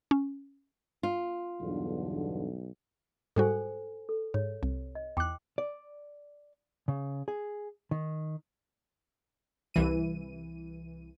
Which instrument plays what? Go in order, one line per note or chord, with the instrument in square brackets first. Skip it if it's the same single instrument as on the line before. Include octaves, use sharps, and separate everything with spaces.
[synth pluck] C#4
[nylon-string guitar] F4
[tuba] B1 [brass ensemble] E2 G2 D3
[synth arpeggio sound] G#2 G3 F#4 [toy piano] A4 C5 G#5
[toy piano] A4
[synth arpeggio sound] G#2 [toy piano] C#5
[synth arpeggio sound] C2
[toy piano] D#5
[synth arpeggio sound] E2 F#6 [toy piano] G5 D6
[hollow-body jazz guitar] D5
C#3
G#4
D#3
[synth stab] C2 E3 D#7